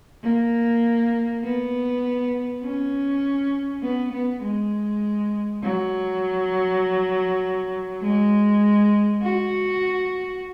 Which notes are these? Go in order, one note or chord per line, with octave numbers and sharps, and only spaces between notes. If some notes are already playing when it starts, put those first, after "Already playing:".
A#3
B3
C#4
B3
B3
G#3
F#3
G#3
F#4